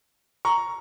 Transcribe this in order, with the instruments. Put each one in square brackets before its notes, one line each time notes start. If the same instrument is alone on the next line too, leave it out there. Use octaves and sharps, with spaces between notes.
[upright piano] A#5 C#6